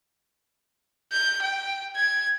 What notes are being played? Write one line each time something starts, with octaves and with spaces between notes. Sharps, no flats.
G6
G5
G#6